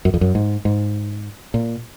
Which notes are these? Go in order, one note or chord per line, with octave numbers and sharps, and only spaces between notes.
F#2
F2
F#2
G#2
G#2
A#2